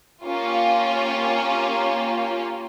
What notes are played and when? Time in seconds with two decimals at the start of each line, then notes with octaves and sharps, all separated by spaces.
0.25 A#3 C#4 F4 G4